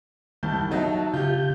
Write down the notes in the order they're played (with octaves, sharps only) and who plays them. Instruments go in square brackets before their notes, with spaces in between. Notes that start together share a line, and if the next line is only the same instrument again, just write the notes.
[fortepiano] C2 [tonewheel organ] D#3 A5 G6
[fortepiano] F#3 D#4 F#4 [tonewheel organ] E5 A5
[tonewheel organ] C#3 G6 [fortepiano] F4 G4